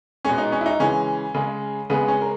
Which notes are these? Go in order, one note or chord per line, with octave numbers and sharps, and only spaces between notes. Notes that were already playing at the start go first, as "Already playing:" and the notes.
B2 G#3 C#4
D#4
C#4
E4
D#4
C#3 E3 G#3 C#4
C#3 G#3
C#3 G#3 B3
C#4
A#4